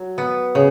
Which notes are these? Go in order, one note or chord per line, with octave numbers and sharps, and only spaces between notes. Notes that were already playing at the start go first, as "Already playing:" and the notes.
Already playing: F#3
B3
C#3